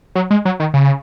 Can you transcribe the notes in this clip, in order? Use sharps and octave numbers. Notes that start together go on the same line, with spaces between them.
F#3
G#3
F#3
D#3
C#3